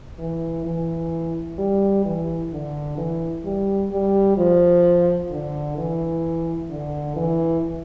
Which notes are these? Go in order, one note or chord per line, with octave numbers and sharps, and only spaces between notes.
E3
E3
G3
E3
D3
E3
G3
G3
F3
D3
E3
D3
E3